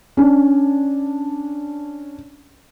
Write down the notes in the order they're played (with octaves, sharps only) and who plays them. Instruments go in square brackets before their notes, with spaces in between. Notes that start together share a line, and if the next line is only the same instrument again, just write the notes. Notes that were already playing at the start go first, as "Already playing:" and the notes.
[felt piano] C#4 D4